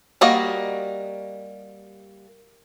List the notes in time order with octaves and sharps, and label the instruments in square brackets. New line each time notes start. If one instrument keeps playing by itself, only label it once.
[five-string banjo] G3 A#3 F#4 D#5